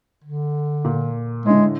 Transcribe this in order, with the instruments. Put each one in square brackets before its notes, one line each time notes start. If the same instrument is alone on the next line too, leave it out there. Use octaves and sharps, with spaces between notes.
[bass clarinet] D3
[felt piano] A#2 A#4
[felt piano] A2 D3 [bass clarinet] G#3